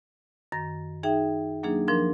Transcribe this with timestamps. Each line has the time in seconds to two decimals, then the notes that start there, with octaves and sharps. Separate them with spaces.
0.52 F#2 D#3 A#6
1.03 D#4 G#4 E5 G5
1.63 F#3 A#3 D4 D#4 G#4
1.88 F3 D4 A#4 C6